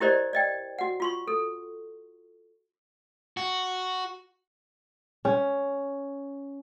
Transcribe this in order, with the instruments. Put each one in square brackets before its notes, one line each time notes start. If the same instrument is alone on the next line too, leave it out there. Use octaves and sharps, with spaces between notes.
[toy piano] E4 G4 A#4 C5 D5 D#5
D5 D#5 G5
F#4 F#5
F4 C6 C#6
A4
[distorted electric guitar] F#4
[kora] C#4